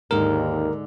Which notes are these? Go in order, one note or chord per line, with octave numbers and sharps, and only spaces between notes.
D#2 G#2 D3 A#4